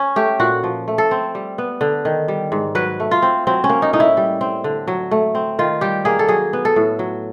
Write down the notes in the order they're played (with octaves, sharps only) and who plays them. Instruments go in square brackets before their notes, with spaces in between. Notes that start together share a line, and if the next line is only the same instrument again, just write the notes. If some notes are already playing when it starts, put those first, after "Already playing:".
Already playing: [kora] C#4
A3 G4
A#2 F#4
F3
A3
A4
C4
G3
B3
D3
D#3
G3
G#2
F#3 B4
A3
F4
C4
F#3 C4
C#4
A#3
D#4
A2 D#4
E4
G3
C4
D3
F#3
A3
C4
D#3 F4
G3 G4
A#3 G#4
A4
F#3 G#4
B3
A4
A2
F#3